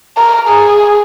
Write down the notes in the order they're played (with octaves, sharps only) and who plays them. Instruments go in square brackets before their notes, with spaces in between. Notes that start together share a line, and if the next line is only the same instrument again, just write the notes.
[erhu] A#4
G#4